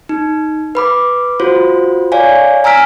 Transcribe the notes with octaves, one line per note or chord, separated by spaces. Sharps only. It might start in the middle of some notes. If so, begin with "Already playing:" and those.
D#4
B4 B5 D6
F4 F#4 C5
C#5 D5 F5 G#5
G#5 A#5 E6 F6 B6 D7